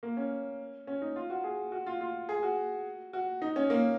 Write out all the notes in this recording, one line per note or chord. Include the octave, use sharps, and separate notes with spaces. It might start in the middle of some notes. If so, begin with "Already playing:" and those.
A#3
C#4
C#4
D#4
F4
F#4
G#4
F#4
F4
F4
G#4
F#4
F#4
D#4
C#4
A#3